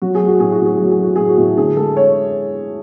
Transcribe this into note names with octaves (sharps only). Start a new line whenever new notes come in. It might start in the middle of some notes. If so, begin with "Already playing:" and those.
F#3 F#4
G#4
A3
F#4
A2 G#4
F#4
A2
G#4
F#3 F#4
G#4
A3 F#4
A2 G#4
F#4
A2
D3 G#4
G#3 A4
C#5